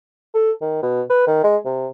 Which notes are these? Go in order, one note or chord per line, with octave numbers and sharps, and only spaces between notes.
A4
D#3
B2
B4
D#3
G#3
C3